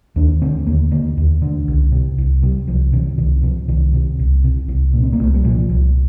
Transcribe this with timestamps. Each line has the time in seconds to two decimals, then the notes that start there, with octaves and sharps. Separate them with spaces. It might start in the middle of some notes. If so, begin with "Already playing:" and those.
0.16 D#2 D4
0.42 D3 C4
0.67 D#2 A#3
0.91 D3 A#3
1.17 D#2
1.42 D3
1.68 C2
1.92 C3
2.18 C2
2.42 C3 G3
2.67 C2 F3
2.93 C3 D#3
3.18 C2 D#3
3.43 C3 F3
3.68 C2 D#3
3.93 C3
4.19 C2
4.44 C3
4.68 C2
4.94 A#2
5.03 C4
5.13 A#3
5.20 C2 A3
5.34 G3
5.45 A#2 F3
5.69 C2